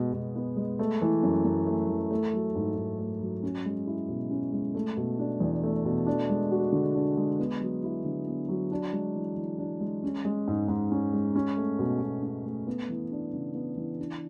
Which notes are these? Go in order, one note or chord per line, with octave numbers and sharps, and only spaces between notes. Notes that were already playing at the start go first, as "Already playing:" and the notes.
Already playing: B2 G#3 B3
B2
B3
G#3
A3
E3
F#2
F#2
A3
E3
A3
F#3
G#2
G#2
A3
F#3
C#4
G#3
E4
B2
C#4
G#3
A3
B2
D4
E2
A3
B2
D4
G#3
F#4
D3
D4
G#3
B3
F#3
E4
D3
B3
F#3
D4
G#3
E3
E3
D4
G#3
C#4
G#3
G#2
G#2
C#4
G#3
C#4
A3
B2
B2
C#4
A3
B3
E3
D4
C#3
B3
E3
D4